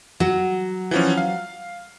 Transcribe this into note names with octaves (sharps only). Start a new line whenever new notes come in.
F#3
E3 F3 C#4
F5